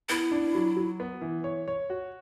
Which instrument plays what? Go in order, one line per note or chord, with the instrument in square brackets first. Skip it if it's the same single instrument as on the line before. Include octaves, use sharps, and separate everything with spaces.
[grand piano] B3 [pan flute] E4
[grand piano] D4
F#3
F#3
B3
E3
C#5
C#5
F#4